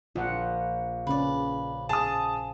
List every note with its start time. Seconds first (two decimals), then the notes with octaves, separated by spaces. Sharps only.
0.16 A#1 F4 F#5
1.07 C#3 C#4 B4 D5
1.89 G#4 A5 D#6